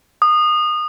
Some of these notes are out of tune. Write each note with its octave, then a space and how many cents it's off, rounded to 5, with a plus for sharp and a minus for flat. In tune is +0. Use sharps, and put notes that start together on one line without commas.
D#6 -25